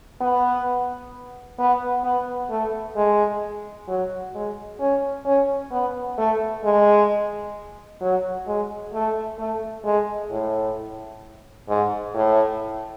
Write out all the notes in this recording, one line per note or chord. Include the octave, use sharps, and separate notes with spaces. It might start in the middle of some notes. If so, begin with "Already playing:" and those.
B3
B3
B3
A3
G#3
F#3
G#3
C#4
C#4
B3
A3
G#3
F#3
G#3
A3
A3
G#3
A2
G#2
A2